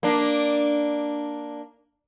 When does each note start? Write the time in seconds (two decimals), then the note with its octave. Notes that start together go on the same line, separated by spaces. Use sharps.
0.03 A#3 D4